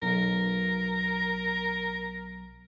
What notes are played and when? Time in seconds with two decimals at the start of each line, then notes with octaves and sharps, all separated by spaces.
0.02 B1 A#4